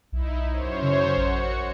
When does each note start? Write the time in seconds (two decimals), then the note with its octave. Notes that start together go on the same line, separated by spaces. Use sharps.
0.12 B1 D#4 E4
0.50 F#2 C5 C#5
0.82 C#3
1.17 A1 F#4 C#7